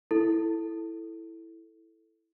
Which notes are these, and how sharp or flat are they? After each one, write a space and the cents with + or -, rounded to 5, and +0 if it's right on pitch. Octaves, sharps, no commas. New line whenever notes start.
E4 +0 A4 +0